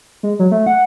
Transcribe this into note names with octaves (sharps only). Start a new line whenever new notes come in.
G#3
F#3
A3
F#5